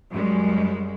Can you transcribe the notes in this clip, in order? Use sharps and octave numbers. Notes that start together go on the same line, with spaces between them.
F#2 G3 G#3